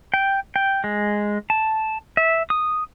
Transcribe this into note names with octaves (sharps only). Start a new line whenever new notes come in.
G5
G5
G#3
A5
E5
D#6